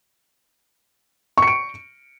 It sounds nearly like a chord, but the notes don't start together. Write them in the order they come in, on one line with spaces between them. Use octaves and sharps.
C#6 C#7 D7